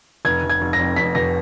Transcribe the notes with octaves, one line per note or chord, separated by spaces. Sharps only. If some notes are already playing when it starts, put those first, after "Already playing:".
F1 G#6
F1
G#6
F1
A#6
F2
F1 B6
F1 A#6